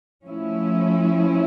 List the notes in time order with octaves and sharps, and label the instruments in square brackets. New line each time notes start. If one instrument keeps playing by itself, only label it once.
[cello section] F3 A3 C#4 E4